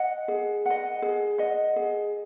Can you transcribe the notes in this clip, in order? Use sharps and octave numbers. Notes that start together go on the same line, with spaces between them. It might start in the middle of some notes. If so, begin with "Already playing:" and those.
Already playing: D#5 F#5
G#4
D#5 F#5
G#4
D#5 F#5
G#4